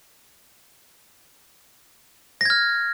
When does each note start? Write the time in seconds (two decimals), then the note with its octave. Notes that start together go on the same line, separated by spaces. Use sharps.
2.41 A#6
2.45 G#6
2.50 F6